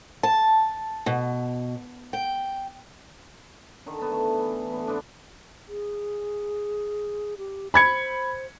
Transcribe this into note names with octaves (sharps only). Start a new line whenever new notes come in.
A5
B2
G5
D3 D#3
B3 A5
A3
E3
D3 B3
D3 B3 C4 D4
G#4
G4
C5 B5 G#6 C#7